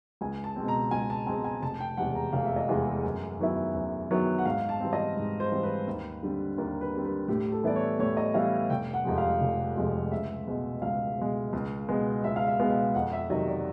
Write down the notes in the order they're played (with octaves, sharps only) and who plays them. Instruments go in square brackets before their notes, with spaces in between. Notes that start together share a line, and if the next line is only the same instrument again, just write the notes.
[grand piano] C#2 [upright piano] G#5
[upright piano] A5
[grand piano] B2 G#3 C4
[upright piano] A#5
[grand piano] C#2 [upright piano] G#5
[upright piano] A5
[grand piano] B2 G#3 C4 [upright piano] G#5
[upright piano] G#5
[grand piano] F1 [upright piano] A5
[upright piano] G5
[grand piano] E2 C3 E3 G#3 [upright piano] F#5
[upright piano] A#5
[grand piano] F1 [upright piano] F5
[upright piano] E5
D#5
[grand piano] E2 C3 E3 G#3 [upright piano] E5
[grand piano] F#2
D#3 F#3 B3 E4
F#2
D#3 F#3 B3 E4
[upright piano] F#5
[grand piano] G#2 [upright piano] F5
[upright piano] A5
[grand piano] E3 G3 C4
[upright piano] D#5
[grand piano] G#2
[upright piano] C5
[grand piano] E3 G3 C4
[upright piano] B4
[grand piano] D#2
D3 G3 C4
[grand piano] D#2 [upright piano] A#4
[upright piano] B4
[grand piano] D3 G3 C4
[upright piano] B4
[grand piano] A2 [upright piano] G4
[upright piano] A4
[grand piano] E3 G3 B3 E4 [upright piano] D5
[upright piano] C#5
[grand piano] A2 [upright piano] C#5
[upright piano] D#5
[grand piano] E3 G3 B3 E4 [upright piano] F5
[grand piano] F1 [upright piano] G5
[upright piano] F#5
[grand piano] F2 C3 F3 G#3
[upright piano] F5
[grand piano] F1
F2 C3 F3 G#3
[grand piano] C#2 [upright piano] E5
[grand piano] B2 G#3
[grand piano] C#2 [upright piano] F5
[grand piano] B2 G#3
C#2
B2 G#3 B3
[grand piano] C#2 [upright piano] E5
[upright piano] F5
E5
[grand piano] B2 G#3 B3
[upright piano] F5
[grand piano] F2 [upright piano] F#5
[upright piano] E5
[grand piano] C3 D#3 F#3 [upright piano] D#5
[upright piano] D5